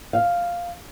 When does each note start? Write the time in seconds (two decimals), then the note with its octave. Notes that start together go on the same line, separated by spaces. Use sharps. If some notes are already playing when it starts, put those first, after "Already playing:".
0.13 F5